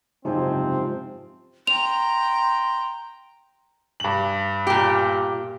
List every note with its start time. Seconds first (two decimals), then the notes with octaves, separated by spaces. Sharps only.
0.25 F#1 G#2 C3 F3 C4 D#4 G#5
1.67 G5 A#5 C6 F7
4.00 G2 F#7
4.67 A#2 G4